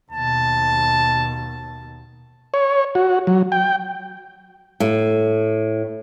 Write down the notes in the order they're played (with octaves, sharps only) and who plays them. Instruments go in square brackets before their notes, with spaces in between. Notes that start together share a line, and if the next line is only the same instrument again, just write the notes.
[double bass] D#2 B2 [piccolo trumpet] A5
[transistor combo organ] C#5
F#4
F#3
G5
[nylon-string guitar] A2